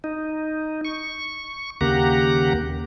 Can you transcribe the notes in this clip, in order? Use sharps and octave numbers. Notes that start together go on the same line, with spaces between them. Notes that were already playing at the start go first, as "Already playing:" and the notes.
D#4
C#6
D#2 C#3 A#3 G4 F#5 A#5